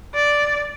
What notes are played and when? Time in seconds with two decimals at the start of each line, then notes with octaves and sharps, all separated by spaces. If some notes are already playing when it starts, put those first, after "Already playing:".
0.15 D5